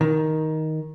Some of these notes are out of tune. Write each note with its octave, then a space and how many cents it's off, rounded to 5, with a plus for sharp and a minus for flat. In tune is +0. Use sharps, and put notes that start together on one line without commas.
D#3 +10